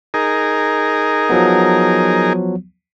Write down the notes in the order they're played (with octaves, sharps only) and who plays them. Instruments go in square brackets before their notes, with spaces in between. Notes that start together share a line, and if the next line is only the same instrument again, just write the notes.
[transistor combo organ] D#4 G#4 A#4
[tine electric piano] F3 F#3 B3